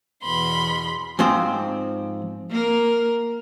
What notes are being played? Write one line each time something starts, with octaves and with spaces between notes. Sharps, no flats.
E2 B2 B5 C6
G#2 F3 C4 C6
A#3 A#4